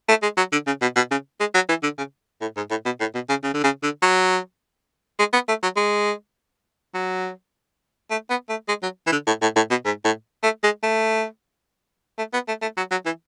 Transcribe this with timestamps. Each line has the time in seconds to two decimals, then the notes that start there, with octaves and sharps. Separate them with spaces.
0.09 A3
0.23 G#3
0.37 F#3
0.52 D3
0.67 C#3
0.82 B2
0.96 B2
1.11 C#3
1.40 G#3
1.55 F#3
1.69 E3
1.83 D3
1.98 C#3
2.41 A2
2.57 G#2
2.70 A2
2.86 B2
3.00 A2
3.14 B2
3.29 C#3
3.43 C#3
3.54 D3
3.64 C#3
3.83 D3
4.02 F#3
5.19 G#3
5.33 B3
5.48 A3
5.63 F#3
5.77 G#3
6.94 F#3
8.10 A3
8.30 B3
8.49 A3
8.68 G#3
8.83 F#3
9.07 E3
9.12 D3
9.27 A2
9.42 A2
9.56 A2
9.70 B2
9.85 G#2
10.05 A2
10.43 A3
10.64 G#3
10.83 A3
12.18 A3
12.33 B3
12.48 A3
12.62 A3
12.77 F#3
12.91 F#3
13.06 E3